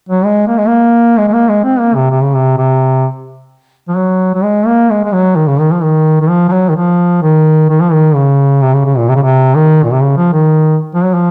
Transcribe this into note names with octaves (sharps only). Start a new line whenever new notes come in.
F#3
G#3
A#3
G#3
A#3
G#3
G#3
A#3
G#3
C4
A#3
C3
C3
C#3
C3
C3
F3
F#3
F#3
G#3
A#3
G#3
G#3
F#3
D#3
C#3
D#3
F3
D#3
D#3
F3
F3
F#3
D#3
F3
D#3
D#3
F3
D#3
C#3
C3
C#3
C#3
A#2
C3
C#3
C3
D#3
A#2
C3
C#3
F3
D#3
F3
F#3
F3